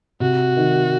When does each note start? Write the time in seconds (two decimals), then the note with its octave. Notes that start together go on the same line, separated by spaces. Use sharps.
0.20 C3 F#4
0.57 D#3